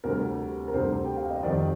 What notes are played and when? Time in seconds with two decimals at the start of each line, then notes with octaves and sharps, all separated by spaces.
0.04 D2 C3 G3 A#4
0.68 A#4
0.74 D2 C3 G3 C5
1.05 G5
1.17 F5
1.30 D#5
1.43 F2 D#3 G3 D5